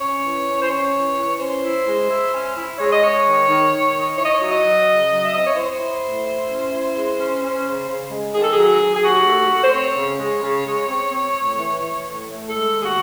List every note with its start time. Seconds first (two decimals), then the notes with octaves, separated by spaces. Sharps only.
0.01 C#4 C#5
0.23 E3
0.47 C#4
0.62 C5
0.69 C#4 C#5
0.92 E3
1.16 E3
1.40 C#4 C5
1.62 E4
1.86 G#3
2.08 E4
2.32 C#4
2.55 E4
2.78 G#3 C#5
2.91 D#5
3.01 G#3 C#5
3.25 D#3
3.47 D#3
3.71 D#3
3.94 D#4
4.17 E4 C#5
4.25 D#5
4.33 C#5
4.40 F#3
4.51 D#5
4.63 F#3
4.86 C#3
5.10 F#3
5.24 E5
5.32 C4 D#5
5.45 C#5
5.55 E4 C5
5.78 E4
6.02 A2
6.25 E4
6.48 C#4
6.71 E4
6.94 G#3
7.18 C#4
7.41 C#4
7.64 C#3
7.87 C#3
8.10 G#3
8.33 D#3 G#4
8.42 A4
8.52 F#3 G#4
8.80 F#3
8.95 G#4
9.03 D#2 F#4
9.25 A3
9.49 A3
9.63 C5
9.71 C4 C#5
9.95 C#3
10.19 G#3
10.42 C#3
10.64 G#3
10.87 C4
11.11 C4
11.34 A2
11.57 E3
11.80 E3
12.03 A2
12.26 A3
12.49 G#3 A4
12.72 D#2
12.79 G#4
12.84 F#4